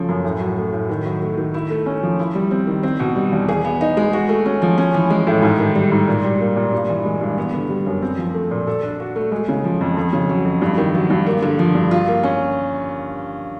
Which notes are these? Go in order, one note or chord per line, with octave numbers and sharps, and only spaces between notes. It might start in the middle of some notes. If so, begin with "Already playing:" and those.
Already playing: C#3 F3 A3
F#2
A2
F#3
A3
A2
D#3
F#3
A3
D#3
E4
A3
C#4
F3
E4
G3
C4
D#3
C4
B2
G3
E2
G#4
B3
D#4
G#3
F#4
A3
C#4
F3
C#4
E3
G#3
A2
G#2
D#3
G3
G#2
A#2
G3
A#3
A#2
G2
E3
G#3
G2
B3
D3
G3
F#2
C4
F3
A3
A#2
A4
D4
F#4
A3
G#3
C#3
F3
F2
F2
C#3
F#3
F2
G2
D#3
F#3
G2
A#3
D3
F3
G2
F4
A#3
C#4